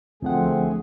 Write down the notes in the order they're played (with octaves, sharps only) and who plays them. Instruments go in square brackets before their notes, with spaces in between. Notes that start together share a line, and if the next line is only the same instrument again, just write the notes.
[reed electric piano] D2 F3 F#5 [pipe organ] D3 A3 G#4 [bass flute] C4